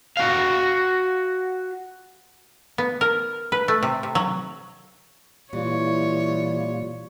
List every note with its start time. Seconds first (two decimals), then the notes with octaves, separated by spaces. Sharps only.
0.17 F#4 F5
2.78 B3
3.01 A#4
3.52 B4
3.68 A3
3.83 C3
4.03 C3
4.15 F#3
5.53 A#2 E3 G3 E4 F4 C#5 D5